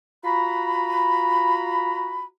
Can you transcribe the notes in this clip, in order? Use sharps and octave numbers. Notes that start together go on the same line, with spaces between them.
F4 F#4 A#5 B5